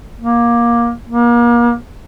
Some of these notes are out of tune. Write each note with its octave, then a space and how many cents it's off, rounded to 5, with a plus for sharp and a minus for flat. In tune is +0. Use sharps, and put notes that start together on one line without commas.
A#3 +20
A#3 +35